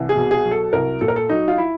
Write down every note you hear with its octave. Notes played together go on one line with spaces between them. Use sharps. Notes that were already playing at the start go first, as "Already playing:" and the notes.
Already playing: C2 E3
G#4
B2
G#4
F#3
A4
C2 A#4
A#2 A4
A#4
A4
F#3 D#4
F4
E4